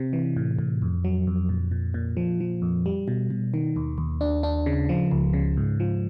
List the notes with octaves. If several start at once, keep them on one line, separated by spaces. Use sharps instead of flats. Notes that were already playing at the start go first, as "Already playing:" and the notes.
Already playing: C3
E3
A2
A2
F2
F#3
F2
A#2
A#2
A#2
F3
F3
F2
G3
B2
B2
D#3
D#2
D#2
D4
D4
C#3
F3
C#2
C#3
G#2
F3